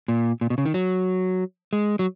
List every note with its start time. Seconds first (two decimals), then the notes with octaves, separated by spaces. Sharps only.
0.08 A#2
0.41 A#2
0.50 B2
0.58 C#3
0.66 D#3
0.74 F#3
1.73 G#3
1.99 F#3